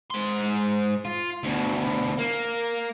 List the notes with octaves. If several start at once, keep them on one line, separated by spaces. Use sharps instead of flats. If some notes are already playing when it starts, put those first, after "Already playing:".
G#2 C6
F4
D2 B2
A#3